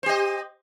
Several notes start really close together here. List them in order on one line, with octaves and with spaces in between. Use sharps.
C5 G4 D#5